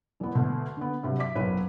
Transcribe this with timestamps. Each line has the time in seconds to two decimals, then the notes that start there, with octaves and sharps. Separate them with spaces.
0.20 E1 B3
0.35 D2 B2
0.77 D3 B3
1.03 G2 C3 F#3 G3
1.19 D5 E5 D6 B6
1.35 F#1 B1 B4 C#5